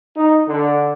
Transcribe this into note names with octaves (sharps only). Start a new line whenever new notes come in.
D#4
D3